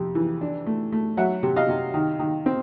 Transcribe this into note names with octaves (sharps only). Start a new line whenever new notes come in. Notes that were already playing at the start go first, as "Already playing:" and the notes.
Already playing: F2 C3
E3
D4
A3
A3
F#3 E5 F#5
C3
D#5 F5
C3
D#3
D#3
C4